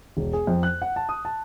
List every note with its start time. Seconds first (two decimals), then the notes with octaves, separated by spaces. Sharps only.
0.17 E1
0.33 G#4
0.47 F2
0.63 F#6
0.82 F#5
0.96 A5
1.09 D#6
1.25 A5